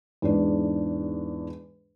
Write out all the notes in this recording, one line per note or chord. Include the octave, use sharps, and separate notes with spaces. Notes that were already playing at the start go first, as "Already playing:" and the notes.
E2 G#2 D4